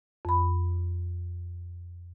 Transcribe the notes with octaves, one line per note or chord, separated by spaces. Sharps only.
F2 B5